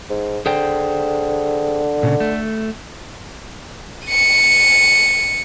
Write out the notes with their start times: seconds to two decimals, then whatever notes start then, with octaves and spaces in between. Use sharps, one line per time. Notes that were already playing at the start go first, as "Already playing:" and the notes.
0.10 G#2
0.46 D3 G#4 C5 G5
2.03 A#2 C#3
2.20 A3
4.06 C#7 D#7